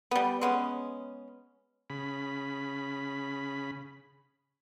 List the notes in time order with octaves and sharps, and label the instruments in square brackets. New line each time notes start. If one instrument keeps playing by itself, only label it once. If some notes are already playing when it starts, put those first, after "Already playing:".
[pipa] G3 B3
G#3 B3 C#4
[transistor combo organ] C#3 B5